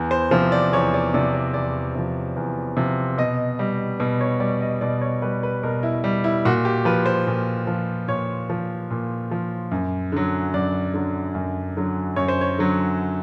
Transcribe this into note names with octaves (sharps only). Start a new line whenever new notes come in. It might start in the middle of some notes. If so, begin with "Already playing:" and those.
Already playing: E2
C5
C3 F3 C5
D5
E2 C#5
D5
C3 F3 D5
D5
E2 D5
C3 F3
E2
C3 F3
B2 D#5
G3
B2
C#5
G3 D5
D#5
B2 D5
C#5
G3 B4
B4
B2 A#4
E4
G3
E4
A#2 F#4
G4
F3 B4
C5
A#2
F3
A#2 C#5
F3
A#2
F3
F#2
D3 F#3
F#2 D5
D3 F#3
F#2
D3 F#3
F#2 C#5
C5
C#5
D3 F#3